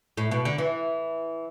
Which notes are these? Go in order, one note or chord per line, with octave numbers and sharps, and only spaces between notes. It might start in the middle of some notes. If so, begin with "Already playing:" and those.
A2
B2
D3
E3